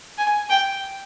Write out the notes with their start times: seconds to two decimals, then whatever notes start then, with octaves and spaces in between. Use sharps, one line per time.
0.18 G#5
0.50 G5